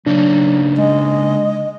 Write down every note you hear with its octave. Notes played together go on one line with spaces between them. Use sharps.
C#3 F#3 A#3 D4 D#4
G#3 D#5